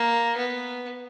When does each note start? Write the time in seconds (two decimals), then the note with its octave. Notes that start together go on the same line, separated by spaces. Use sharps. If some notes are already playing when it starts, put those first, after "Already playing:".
Already playing: A#3
0.37 B3